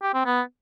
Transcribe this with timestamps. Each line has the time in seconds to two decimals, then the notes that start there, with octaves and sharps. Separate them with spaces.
0.02 G4
0.14 C4
0.26 B3